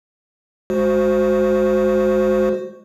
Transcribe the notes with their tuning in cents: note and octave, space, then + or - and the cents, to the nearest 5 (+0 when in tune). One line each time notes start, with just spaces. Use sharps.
G#3 +0 F#4 +0 C5 +0